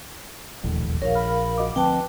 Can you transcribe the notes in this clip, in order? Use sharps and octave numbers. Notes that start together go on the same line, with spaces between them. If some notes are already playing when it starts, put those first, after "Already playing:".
E1 A#1 D#2 A2
A#1 A#4 C#5 F5
B5 F6
F#4 D#5 D6
D2 F3 C4 B4 G5 A5